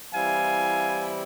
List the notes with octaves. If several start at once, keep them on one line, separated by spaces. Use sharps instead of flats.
E3 G3 C4 E4 F5 G#5